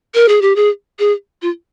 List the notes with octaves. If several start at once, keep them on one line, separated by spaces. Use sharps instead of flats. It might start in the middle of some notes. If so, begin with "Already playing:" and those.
A#4
G#4
G4
G#4
G#4
F4